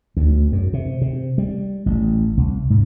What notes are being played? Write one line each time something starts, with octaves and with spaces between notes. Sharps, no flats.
D2
F#2
C3
C3
G3
A1
C2
G#2